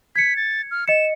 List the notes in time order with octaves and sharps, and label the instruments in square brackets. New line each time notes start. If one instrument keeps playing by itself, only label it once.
[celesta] G#6 C#7 [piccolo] B6
[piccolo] A6
F6
[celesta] D#5 C#7 [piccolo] E7